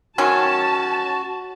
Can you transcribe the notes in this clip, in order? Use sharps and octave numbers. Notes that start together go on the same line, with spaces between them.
D#3 F#3 C#4 F#4 A5